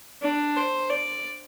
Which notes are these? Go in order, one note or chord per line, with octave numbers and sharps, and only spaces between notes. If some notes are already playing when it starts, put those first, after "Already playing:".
D4
C5
D5